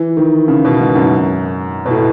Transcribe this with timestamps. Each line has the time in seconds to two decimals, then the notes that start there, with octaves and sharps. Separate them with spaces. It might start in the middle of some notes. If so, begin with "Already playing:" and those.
Already playing: E3
0.17 D#3
0.48 C#3
0.65 B2
0.80 G#2
0.95 F#2
1.86 B2
1.90 A2